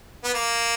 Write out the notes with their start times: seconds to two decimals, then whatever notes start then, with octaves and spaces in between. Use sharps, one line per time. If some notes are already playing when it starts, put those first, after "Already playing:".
0.24 B3
0.34 A#3